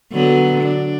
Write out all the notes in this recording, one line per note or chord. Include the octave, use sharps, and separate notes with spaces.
D3 F#3 B3
D4